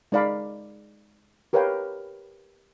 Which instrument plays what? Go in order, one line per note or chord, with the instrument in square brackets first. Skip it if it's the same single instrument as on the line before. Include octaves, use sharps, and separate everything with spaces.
[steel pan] G#3 D#4 D5 F5 B5
G4 A#4 B4 C#5 F5 G5